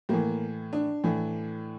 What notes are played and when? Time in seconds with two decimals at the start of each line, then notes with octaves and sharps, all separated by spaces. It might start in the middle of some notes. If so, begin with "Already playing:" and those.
0.09 A2 E3 A#3
0.73 D4
1.04 A2 E3